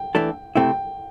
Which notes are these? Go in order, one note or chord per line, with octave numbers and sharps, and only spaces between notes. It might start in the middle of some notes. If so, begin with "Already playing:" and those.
Already playing: G5
E3 A3 D4 A4
C3 A3 C4 E4 G5